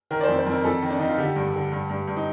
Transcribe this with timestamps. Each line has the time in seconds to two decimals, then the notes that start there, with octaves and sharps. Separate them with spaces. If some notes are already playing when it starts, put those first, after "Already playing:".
0.11 D#3 A#4
0.21 D5
0.23 C5
0.28 F2
0.38 C5
0.46 F2 A#4
0.64 F2 A4
0.82 D#3
0.90 D4
0.99 D#3 D#4
1.09 F4
1.18 D3 G4
1.36 G2
1.54 D3
1.72 G2
1.90 G2
2.08 G2
2.17 D#4